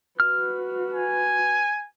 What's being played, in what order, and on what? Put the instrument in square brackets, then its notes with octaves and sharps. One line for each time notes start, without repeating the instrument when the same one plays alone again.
[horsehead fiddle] F#4 B4 [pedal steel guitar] F6
[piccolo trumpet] G#5